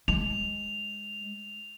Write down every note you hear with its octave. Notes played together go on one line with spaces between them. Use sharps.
G#3 F7